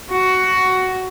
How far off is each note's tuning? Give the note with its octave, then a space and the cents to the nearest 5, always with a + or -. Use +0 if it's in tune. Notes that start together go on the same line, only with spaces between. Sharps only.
F#4 +10